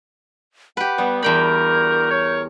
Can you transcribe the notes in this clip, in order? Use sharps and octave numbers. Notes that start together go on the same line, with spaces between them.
G4 B4 F#5
G3 B3
E2 D4 F#4 A#4 G5 B5 G6
A#4 C#5